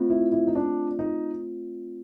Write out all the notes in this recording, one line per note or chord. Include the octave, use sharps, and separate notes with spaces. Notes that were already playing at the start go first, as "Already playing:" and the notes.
Already playing: A3 C4 F4
E4
E4
D#4
D4
D#4